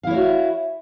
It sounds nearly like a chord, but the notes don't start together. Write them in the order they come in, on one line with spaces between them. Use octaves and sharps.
F5 E4 C#5 F#4